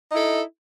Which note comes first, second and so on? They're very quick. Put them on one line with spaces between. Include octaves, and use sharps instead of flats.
D#4 E4 A4